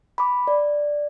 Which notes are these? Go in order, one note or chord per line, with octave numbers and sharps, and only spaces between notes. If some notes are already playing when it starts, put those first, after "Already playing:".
B5 D6
D5